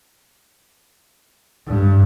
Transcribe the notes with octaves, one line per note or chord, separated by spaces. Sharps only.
G2